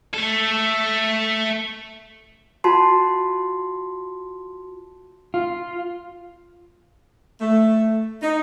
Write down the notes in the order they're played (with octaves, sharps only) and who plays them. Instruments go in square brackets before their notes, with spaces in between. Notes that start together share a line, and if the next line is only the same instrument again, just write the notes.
[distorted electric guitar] A3 A4
[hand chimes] F4 F#4 A5 C6
[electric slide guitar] F4
[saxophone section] A3
D#4